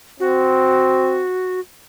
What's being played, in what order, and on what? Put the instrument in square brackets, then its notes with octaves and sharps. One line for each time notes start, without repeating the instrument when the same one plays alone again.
[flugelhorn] C4 [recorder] F#4